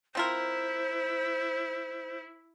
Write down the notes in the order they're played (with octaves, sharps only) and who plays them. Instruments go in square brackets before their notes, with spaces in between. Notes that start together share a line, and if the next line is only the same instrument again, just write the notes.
[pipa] C4 F4 A#4 [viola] E4 [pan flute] C5